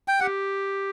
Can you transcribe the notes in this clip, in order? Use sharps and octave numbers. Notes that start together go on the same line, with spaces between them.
G5
G4 F#5